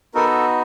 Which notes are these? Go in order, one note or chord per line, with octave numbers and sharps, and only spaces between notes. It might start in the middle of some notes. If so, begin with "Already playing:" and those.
B3 D#4 F#4 A4 A#4